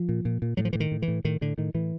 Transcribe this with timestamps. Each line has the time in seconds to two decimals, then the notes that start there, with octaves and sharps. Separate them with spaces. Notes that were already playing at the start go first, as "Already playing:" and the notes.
Already playing: F3
0.09 A#2
0.25 A#2
0.42 A#2
0.57 A2 F#3
0.65 F3
0.73 A2 E3
0.80 D#3
0.92 A2
1.02 E3
1.08 A2
1.25 A2 D#3
1.41 A2 D3
1.58 A2 D#3
1.74 A2 E3